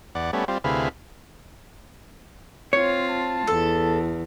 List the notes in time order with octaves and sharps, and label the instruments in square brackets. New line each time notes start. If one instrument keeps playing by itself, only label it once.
[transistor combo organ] E2 D5 F#5
G3 A3 B3 C#4
G3 C4 F4
D2 C3 E4 G#4 B4 F5
[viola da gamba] C4 F4 [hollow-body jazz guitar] C#5
[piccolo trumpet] A5
[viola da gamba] E2 [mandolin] A4